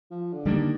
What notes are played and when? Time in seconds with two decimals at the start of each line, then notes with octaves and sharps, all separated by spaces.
0.11 F3
0.33 D3
0.45 D3 D#3 G3 A#3 D4